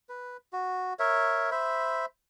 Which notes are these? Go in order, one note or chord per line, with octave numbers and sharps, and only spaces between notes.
B4
F#4
A#4 C#5 E5
C5 E5 B5